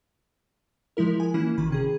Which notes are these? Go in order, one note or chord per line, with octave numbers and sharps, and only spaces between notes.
F3 G#3 E4 A#4
G#5
E3 A#3 C#4 E4
G#1 D#3 B5
C3 C#4 G#4